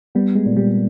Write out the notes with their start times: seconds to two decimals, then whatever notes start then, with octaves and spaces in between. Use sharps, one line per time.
0.15 G3 B3
0.35 G#3
0.45 A#2
0.57 G3